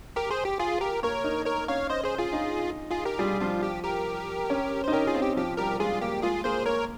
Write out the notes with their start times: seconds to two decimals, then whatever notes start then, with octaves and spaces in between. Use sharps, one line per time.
0.16 G4 A#4
0.31 G#4 C5
0.45 G4
0.59 F4 G#4
0.81 G4 A#4
1.03 A#3 A#4 C#5
1.24 D#4
1.46 A#4 C#5
1.68 C#4 C#5 F5
1.90 C5 D#5
2.04 G#4 C5
2.18 F4 G#4
2.33 D#4
2.91 F4 G#4
3.05 G4 A#4
3.19 G3 F4 G#4
3.41 F3 F4
3.63 G4
3.84 G4 A#4
4.50 C#4
4.84 D#4 C5
4.92 C#4 G4 A#4
5.07 F4 G#4
5.15 C4
5.22 G4
5.36 F3 G4
5.57 G3 G4 A#4
5.80 G#3 F4 G#4
6.01 A#3 G4
6.22 G#3 F4 G#4
6.44 A#3 G#4 C5
6.66 A#3 A#4 C#5